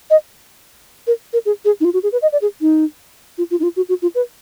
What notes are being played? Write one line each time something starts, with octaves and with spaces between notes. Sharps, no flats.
D#5
A#4
A#4
G#4
G#4
D#4
F4
F#4
G#4
B4
D#5
D5
G#4
D#4
F4
F4
D#4
F4
F#4
F#4
F4
B4